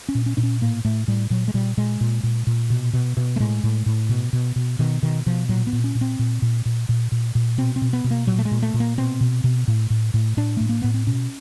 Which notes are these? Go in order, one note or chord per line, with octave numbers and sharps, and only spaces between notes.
C#4
A#2
C#4
A#2 D4
C#4
A2 A#3
A2 A3
A2 G3
A#2 F#3
G#3
A#2 G3
A#2 G#3
A#2
A#2
A#2
B2
B2
B2
A3
A2 G#3
A2
A2
B2
B2
B2
B2 D#3
B2 D#3
B2 F3
A#2 F#3
B3
A#2
C#4
A#2
C4
A#2
A#2
A#2
A#2
A#2
A#2
B2 C4
C4
B2
B3
B2
A#3
A#2 F#3
A3
G#3
A#2
A3
A#2
A#3
B2 C4
B2
B2
A2
A2
A2
A2 D4
A2 A3
A#3
A2 B3
C4
B2 C#4